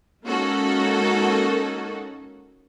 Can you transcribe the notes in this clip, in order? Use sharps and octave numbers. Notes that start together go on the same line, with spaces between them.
G#3 A#3 C#4 D#4 F#4 A4